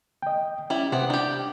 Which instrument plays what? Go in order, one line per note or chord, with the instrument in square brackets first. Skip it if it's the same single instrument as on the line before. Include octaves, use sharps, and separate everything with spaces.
[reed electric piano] D#5 G5
[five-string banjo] G3 E4 [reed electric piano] C#4
[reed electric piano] C3 [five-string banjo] B3 C4
[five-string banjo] G3 G4 [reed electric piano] D4